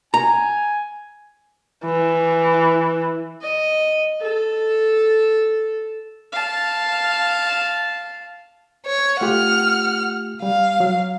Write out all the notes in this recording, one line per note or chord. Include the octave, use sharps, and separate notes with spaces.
G#5 A#5
E3
D#5
A4
F5 A5
C#5
A3 F4 G4 F#5 F6
G3 F5
F#3